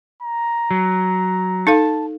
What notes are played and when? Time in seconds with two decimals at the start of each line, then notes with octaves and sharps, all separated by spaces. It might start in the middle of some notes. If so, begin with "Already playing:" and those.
0.22 A#5
0.71 F#3
1.67 D#4 A4 F5 A5